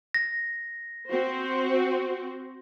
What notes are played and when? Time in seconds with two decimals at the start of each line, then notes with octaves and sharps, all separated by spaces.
0.14 A#6
1.09 C4 F#4 C5